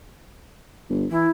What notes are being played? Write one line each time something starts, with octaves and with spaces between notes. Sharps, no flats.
G1
E3 E4